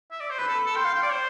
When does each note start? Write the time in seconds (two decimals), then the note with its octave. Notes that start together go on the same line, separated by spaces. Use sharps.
0.11 E5
0.20 D5
0.30 C5
0.39 B4 B5
0.48 A4
0.66 A4
0.76 G5 C6
0.85 F5
0.95 G5
1.03 D5
1.12 C5